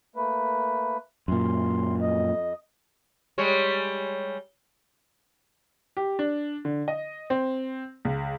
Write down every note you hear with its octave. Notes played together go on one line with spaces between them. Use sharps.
A3 A#3 B4
F#2 A#2 C6
F2 D#5
G3 G#3 C#5
G4
D4
D3
D#5
C4
C#2